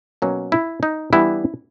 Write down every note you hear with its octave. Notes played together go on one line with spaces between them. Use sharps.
B2 F#3 A#3 C#4
E4
D#4
E3 G3 B3 D4 E4